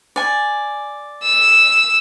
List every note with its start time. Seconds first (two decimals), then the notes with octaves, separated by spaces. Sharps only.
0.16 D5 G#5
1.23 E6